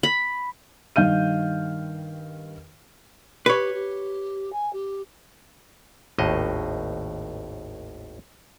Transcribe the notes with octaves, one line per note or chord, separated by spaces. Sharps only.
B5
G2 D#3 F5 G6 D#7
G4 B4 C#5
G4
G#5
G4
G#1 D#2 A2 D#5